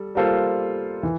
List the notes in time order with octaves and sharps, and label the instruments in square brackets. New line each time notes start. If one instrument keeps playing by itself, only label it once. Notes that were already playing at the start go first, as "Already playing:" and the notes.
Already playing: [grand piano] G3 A4
G3 A#3 F4 A4 C5
E3